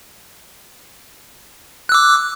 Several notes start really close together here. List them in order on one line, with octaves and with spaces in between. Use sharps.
F#6 E6 D6